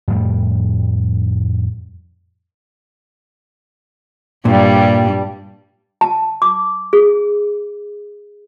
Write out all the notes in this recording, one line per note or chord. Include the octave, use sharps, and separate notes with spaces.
F2 A2 G3
G2 A#2 G3
A5
D6
G#4